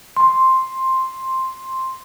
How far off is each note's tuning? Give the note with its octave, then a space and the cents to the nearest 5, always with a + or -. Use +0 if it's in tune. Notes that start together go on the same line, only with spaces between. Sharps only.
C6 +5